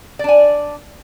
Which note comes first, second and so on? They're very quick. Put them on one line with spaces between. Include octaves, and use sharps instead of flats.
D5 D4 G#5